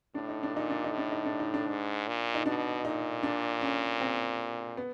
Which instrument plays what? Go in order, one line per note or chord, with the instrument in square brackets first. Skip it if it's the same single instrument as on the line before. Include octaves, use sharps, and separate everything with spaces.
[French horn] A2 [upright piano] D4
[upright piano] D#4
D4
[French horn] A#2 [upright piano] D#4
[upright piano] D4
D#4
[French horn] A2
[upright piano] D4
D#4
D4
D#4
D4
[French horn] G#2
A#2
[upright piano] D#4
[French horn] B2 [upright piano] D4
[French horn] A#2 [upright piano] D#4
[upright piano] D4
C#4
C4
B3